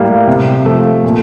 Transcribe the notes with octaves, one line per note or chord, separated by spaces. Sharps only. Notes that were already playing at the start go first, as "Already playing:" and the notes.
Already playing: A2 G3 A#3
C3
F3 A3
A#2